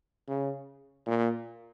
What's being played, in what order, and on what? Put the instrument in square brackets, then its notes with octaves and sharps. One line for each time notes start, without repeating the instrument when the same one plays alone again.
[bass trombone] C#3
A#2